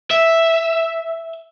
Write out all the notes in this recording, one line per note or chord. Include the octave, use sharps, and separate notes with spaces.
E5